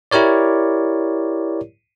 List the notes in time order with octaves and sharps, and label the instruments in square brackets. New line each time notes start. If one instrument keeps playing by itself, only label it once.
[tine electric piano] E4 G4 A#4 C#5 D5